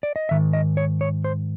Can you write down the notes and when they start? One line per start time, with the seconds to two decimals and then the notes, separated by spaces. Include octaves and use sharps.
0.03 D5
0.16 D#5
0.29 G#2 D#3 E5
0.53 D#5
0.77 C#5
1.01 C#5
1.24 C5